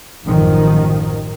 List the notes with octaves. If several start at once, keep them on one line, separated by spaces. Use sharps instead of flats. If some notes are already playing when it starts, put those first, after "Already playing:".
A1 F#2 D#3 F3